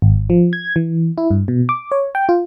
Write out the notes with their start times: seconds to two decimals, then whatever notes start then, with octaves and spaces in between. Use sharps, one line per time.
0.02 G#1
0.30 F3
0.53 G#6
0.76 E3
1.18 E4
1.31 G2
1.48 B2
1.69 D6
1.92 C#5
2.15 G5
2.29 F4